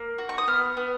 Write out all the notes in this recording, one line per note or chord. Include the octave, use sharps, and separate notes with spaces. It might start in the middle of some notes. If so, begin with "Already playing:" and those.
Already playing: A#3
F#4
C#6
D#6
B3 F6
B3